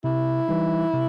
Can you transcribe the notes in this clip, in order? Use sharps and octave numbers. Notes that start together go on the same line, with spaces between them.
C3 E4
E3 G3 D#4
C3